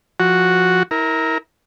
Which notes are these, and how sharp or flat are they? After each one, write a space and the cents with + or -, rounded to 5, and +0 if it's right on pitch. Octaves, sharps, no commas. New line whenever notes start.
F3 +5 F#4 +0
E4 -30 A#4 +0